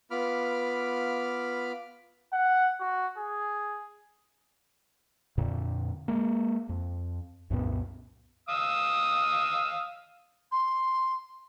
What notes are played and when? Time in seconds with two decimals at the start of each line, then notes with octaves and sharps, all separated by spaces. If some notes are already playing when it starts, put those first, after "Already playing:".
0.11 B3 F4 B5 D6 F6
2.33 F#5
2.80 F#4
3.17 G#4
5.38 F2 A#2 D3
6.08 G#3 A#3
6.69 F2
7.50 C2 F#2 A#2 B3
8.49 F5 D#6 E6
10.51 C6